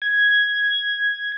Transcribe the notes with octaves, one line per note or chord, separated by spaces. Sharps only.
G#6